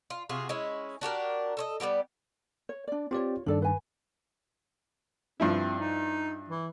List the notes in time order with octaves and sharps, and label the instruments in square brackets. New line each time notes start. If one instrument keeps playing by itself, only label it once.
[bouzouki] F4
C3 F4 F#4 G#4
G#3 C#4 E4
D4 F#4 G4 A#4
A4 C#5 D#5
G3 A3 B3 G4
[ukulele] C#5
D4 D5
[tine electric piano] C4 G4 D5 [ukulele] F4 C#5
[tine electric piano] G2 D#3 [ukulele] D4 A4 D5
[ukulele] B4 G#5
[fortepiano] G2 F3 E4 [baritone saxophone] C4
[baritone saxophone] D#4
E3